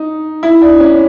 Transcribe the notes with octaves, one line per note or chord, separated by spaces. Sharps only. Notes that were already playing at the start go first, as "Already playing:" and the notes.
Already playing: D#4
E4
D4
C#4